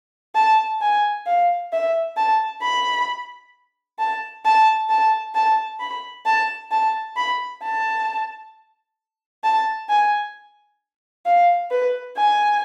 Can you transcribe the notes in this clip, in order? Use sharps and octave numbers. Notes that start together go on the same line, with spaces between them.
A5
G#5
F5
E5
A5
B5
A5
A5
A5
A5
B5
A5
A5
B5
A5
A5
G#5
F5
B4
G#5